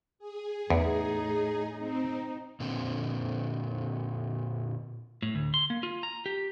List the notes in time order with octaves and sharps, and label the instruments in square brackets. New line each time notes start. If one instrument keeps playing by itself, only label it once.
[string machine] G#4
[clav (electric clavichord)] E2 [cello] A2 D#4
[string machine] C4 [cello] D#4
[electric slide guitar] A#2 D3 C4
[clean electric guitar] A2
D2
C6
A#3
F4
A#5
G4